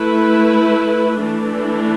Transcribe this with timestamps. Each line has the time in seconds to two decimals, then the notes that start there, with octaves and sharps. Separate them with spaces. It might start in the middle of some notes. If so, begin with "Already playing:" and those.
Already playing: A3 E4 B4
1.18 E3 A3 D4